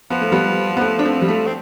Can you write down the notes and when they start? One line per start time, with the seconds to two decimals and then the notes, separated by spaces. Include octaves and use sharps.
0.10 F3 B3
0.21 A3
0.32 G3 B3
0.77 B3
0.81 A3
0.99 D4
1.05 A3 C4
1.22 G3
1.28 A3
1.46 C4